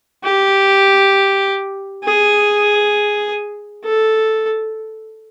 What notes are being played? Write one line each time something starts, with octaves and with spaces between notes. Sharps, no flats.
G4
G#4
A4